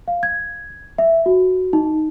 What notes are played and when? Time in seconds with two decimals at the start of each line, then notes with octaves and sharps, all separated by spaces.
0.08 F5
0.23 G#6
0.98 E5
1.26 F#4
1.73 D#4